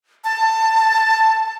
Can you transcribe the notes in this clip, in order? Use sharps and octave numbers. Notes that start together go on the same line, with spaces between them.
A5